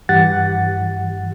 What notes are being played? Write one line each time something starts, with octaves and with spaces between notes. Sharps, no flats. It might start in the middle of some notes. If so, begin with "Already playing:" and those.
G2 E3 G4 F#5 A6